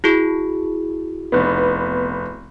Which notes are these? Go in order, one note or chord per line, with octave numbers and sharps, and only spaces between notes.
E4 F#4 G#4
F1 B3